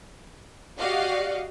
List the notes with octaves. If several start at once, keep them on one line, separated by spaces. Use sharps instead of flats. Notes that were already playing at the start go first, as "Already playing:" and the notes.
F#4 G4 D5 D#5 F5 F#5